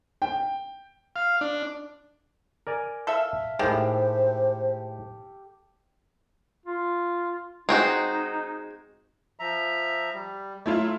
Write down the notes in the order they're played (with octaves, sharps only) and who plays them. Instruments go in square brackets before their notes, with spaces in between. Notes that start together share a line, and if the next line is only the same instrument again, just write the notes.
[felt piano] G5
[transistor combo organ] F5
D4
[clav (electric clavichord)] A#4 D5 G#5
[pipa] A4 E5 [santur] F5
[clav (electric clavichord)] A2 G#3 [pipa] D#3 [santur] G4 A4 E6 [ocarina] C5
[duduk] F4
[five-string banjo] G#3 C4 F#4 [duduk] D#4
[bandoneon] F3 E5 A#5
G3
[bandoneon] F#3 [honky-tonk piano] A3 E4 F4